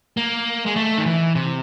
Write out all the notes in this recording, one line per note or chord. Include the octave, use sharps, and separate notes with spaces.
A#3
G#3
A3
D#3
E3
C3